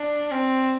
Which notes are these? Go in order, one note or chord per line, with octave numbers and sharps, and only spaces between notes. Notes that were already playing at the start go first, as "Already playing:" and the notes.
Already playing: D4
C4